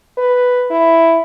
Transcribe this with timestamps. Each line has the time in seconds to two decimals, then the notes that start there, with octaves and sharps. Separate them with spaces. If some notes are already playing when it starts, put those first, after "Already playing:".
0.18 B4
0.71 E4